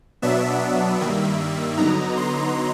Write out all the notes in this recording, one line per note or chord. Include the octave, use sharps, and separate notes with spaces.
B2 F#3 B3 D4 E5
E5
G2 D#3 G3 A#3
D3 F#3 B3 D#4 A#5
C6